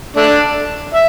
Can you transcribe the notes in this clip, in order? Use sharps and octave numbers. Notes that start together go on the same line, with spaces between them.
A3 D4
E5